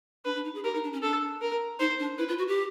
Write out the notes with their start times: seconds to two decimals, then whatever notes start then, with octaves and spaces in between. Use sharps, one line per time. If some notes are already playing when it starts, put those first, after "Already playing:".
0.25 D4 B4
0.36 D4
0.45 D#4
0.55 G#4
0.64 G4 A#4
0.74 D#4
0.84 D4
0.93 C#4
1.03 D4 A4
1.41 A#4
1.80 D#4 C5
1.99 D4
2.18 E4 B4
2.29 F4
2.38 F#4
2.48 G4